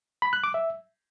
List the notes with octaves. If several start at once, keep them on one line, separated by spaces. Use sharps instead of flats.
B5
F#6
D6
E5